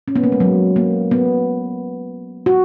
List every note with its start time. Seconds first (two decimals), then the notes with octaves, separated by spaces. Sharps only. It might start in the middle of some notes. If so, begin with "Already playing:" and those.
0.08 C#4
0.16 B3
0.23 A#3
0.32 G#3
0.40 F#3
0.76 A#3
1.11 B3
2.46 F#4